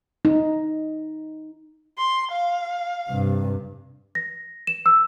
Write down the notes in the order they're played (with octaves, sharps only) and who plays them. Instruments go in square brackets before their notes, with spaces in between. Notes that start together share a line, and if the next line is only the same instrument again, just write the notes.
[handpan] D#4
[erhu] C6
F5
[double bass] G2 C3
[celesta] A#6
E7
E6